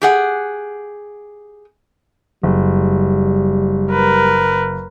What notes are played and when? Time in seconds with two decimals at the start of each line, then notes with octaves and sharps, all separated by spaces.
0.02 G4 G#4 F#5
2.43 F#1 G3
3.91 A#4 B4